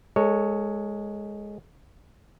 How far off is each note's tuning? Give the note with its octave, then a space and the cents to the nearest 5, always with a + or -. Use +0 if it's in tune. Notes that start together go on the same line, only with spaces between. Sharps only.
G#3 +0 A4 +30 C#5 +0